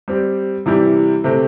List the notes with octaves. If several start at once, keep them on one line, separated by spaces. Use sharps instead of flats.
G3 C4 G4
C3 E3 G3 E4 G4
C3 A3 C4 G4